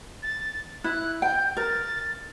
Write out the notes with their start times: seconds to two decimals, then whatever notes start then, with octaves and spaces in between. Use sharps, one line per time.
0.23 A6
0.84 E4 F#6
1.22 G5 G6
1.57 A#4 A6